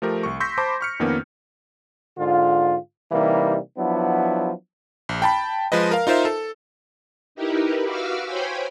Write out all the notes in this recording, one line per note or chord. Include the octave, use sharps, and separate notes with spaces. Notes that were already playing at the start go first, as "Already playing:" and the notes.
F3 A3 G4 A#4
C2 C#6
C6 C#6 E6 G6 A#6 B6
C5 A5 B5 C6 D6
C#6 F6 C#7
F2 D#3 A#3 B3 C#4
G#2 D3 F4
C3 E3 G3 A#3 D#4
F3 F#3 B3 D4 E4
A#1
G5 A5 B5
F3 G#3 B4 D#5
A#4 F5
D#4 F4 A#4 C5 E5
A4
D#4 E4 G4 A#4 B4
F#4 B4 F5 D6 E6 F6
C5 C#5 G5 G#5 B5